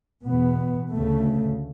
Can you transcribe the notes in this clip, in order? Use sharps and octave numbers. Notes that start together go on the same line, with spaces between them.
E2 B2 B3
D2 C#3 A3